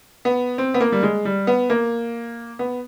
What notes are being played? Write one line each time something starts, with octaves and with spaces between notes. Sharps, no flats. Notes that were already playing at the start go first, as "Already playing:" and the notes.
B3
C4
B3
A#3
G3
G#3
G3
B3
A#3
B3